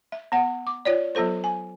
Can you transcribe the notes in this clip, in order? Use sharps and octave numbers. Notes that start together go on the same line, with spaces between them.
E5
B3 F#5
D6
F4 C#5 D5
F#3 B3 F4 A4 C5
G#5